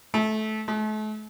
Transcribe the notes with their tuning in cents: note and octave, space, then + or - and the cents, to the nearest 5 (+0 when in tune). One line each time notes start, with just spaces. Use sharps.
A3 -20
A3 -40